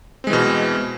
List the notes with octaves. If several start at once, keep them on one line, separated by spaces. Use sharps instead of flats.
B2 E3 G#3 C4